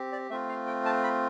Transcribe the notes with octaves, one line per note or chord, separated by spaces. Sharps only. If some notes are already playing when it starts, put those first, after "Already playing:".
Already playing: C4 G4
D5
A3 C4 F4 E5
F5
G5
A5
B5